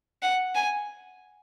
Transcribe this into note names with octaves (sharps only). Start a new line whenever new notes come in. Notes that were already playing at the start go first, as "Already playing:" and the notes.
F#5
G#5